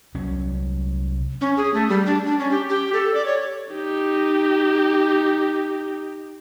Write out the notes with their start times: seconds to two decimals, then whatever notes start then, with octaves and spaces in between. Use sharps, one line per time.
0.14 C2 F#3 C#4
1.41 C#4
1.57 G#4
1.74 A3
1.89 G3
2.06 D4
2.26 D4
2.39 C#4
2.51 G4
2.69 G4
2.94 A4
3.14 D5
3.25 C#5
3.73 D#4 G4